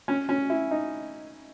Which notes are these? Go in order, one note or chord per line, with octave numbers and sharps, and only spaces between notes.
C#4
C#4
E4
D#4